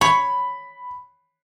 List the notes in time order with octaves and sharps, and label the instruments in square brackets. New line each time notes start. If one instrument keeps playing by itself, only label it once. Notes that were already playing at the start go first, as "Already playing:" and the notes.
[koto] C#5 [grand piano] B5